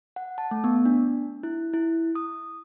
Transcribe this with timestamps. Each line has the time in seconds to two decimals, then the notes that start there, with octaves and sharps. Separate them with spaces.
0.16 F#5
0.38 A5
0.51 A3
0.64 B3
0.85 D4
1.43 E4
1.73 E4
2.15 D#6